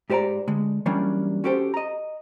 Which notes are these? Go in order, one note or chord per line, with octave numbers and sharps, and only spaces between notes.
G#2 G4 C5 D5 F#5 A#5
D3 G#3
E3 F#3 G3 A#3 C#4 D4
C#4 F#4 G4 A4 C5
D#5 A#5